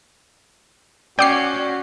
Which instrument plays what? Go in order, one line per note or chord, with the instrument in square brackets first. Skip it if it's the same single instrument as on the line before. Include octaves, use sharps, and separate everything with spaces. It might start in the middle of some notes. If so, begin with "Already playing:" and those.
[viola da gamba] C#4 [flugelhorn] F#4 [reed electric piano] D5 [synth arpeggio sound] G5 D6 C7